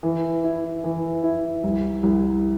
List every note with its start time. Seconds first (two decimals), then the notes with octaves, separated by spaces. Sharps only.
0.03 E3
0.44 E4
0.84 E3
1.23 E4
1.64 C2
2.03 C2